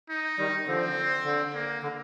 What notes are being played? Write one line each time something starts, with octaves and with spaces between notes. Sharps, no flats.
D#4
D#3 G3
D3 F3 C4
D3
A#3
D3